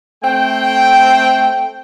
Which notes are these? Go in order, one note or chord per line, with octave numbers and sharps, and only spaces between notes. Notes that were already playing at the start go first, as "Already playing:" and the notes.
A3 C4 G5